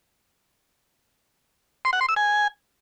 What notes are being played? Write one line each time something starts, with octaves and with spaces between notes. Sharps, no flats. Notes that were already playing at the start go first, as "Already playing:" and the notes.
C6
F#5
C6
E6
G#5